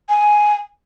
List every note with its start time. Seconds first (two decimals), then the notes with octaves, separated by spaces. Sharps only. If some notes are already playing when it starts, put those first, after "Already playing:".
0.09 G#5